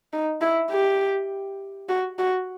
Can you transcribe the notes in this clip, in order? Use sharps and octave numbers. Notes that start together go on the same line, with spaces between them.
D#4
E4
G4
F#4
F#4